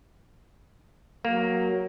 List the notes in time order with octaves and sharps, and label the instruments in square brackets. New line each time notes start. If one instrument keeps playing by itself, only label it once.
[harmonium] F#3 [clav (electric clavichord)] A#3